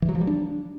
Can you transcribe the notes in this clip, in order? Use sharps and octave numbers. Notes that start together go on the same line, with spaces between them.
E3
F#3
F3
G3
D4